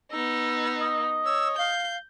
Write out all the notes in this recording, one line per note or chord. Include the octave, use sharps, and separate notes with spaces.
B3 D#4 E6
D#5
C#5 E6
F5 G6